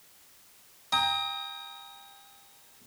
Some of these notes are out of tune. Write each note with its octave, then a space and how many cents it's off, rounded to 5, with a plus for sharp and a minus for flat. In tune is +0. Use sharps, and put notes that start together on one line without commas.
G5 +30 A#5 +0 D#6 +30